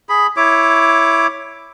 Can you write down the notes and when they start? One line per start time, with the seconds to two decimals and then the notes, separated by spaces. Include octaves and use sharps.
0.09 G#4 B5
0.37 E4 C#5 D6